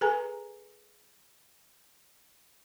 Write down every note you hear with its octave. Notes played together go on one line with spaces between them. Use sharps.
G#4 A4 B4 G#5 A#5